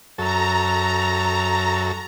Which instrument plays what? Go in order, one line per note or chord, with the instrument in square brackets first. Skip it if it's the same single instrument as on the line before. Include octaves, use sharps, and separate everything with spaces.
[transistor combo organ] F#2 A4 [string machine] A#5